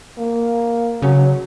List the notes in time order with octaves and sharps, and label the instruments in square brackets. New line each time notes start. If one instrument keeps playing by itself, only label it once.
[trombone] A#3
[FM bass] C#3 [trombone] F#3